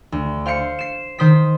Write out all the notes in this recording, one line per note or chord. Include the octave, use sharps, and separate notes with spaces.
D2
C5 F5 C7 C#7
C7 E7
D#3 C5 D#6 B6